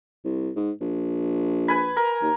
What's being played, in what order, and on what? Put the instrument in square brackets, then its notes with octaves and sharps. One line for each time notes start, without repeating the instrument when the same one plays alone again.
[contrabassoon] C2
G#2
A#1
[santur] B4 G#5 B5
A#4
[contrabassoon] D#2